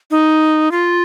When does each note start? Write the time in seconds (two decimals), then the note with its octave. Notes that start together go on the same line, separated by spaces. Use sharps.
0.11 D#4
0.71 F4